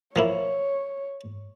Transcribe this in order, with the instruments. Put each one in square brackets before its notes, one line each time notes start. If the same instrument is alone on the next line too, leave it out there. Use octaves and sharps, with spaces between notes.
[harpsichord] F3 A#3 E4 [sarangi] C#5